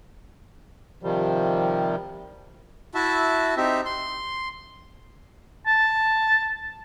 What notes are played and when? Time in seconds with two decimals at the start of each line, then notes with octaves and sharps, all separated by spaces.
1.03 C3 D#3 F3 G3
2.95 E4 F#4 E5 A5
3.57 C4 D#4 G4 E5
3.85 C6
5.66 A5